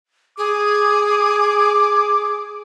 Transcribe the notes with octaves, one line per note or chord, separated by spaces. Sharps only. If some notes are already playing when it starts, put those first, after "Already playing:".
G#4 D6